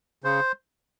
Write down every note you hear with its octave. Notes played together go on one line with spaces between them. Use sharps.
C#3 C5